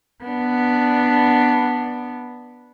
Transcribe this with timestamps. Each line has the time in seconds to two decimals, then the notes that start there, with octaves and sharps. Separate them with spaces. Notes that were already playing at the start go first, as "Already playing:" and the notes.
0.24 B3 D4